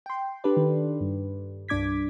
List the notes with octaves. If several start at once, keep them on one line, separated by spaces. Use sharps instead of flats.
G5 C6
D4 G4 A4 B4 D5
D#3
G2
C2 G2 D4 D6 G#6 B6